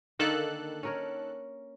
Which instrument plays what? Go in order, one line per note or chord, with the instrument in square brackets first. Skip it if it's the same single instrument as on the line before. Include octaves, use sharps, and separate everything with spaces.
[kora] D3 A#3 [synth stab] D#3 A4 F#6
[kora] C#4 A#4 C#5